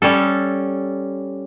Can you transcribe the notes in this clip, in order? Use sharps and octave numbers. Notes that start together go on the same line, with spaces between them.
G3 C#4 A4